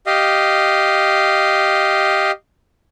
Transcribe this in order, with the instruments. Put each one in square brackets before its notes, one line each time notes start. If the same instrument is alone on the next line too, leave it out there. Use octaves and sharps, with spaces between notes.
[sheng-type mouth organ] G4 D#5 F5